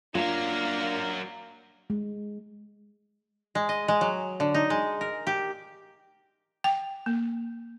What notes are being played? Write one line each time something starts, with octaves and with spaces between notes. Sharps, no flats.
F#3 A#3 D4 F4 A#4
G#3
G#3
D#5
G#3
F#3
D3
D#4
G#3
A#4
G4
G5
A#3